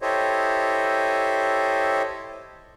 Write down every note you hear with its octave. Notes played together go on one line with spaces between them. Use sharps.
E4 G4 A4 C5 C#5 D#5